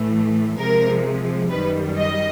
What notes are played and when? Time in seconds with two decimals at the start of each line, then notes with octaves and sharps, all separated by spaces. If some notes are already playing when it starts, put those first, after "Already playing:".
Already playing: A2 E3 A3
0.58 C3 F3 G#3 A#4
1.50 F#2 D#3 G3 B4
1.96 D#5